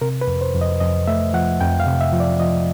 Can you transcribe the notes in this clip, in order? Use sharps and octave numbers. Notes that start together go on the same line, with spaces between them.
C3 A#4
B4
F2
C5
F2
D#5
F2 D#5
A3 E5
F3 F#5
F2 G5
F5
C3
E5
F3
D5
F3 D#5